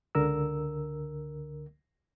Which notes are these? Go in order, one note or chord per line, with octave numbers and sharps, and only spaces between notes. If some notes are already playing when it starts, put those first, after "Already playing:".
C#2 D3 A#4 E6